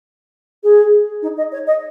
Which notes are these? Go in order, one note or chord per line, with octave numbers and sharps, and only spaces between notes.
G#4
D#4
D#5
C#5
D#5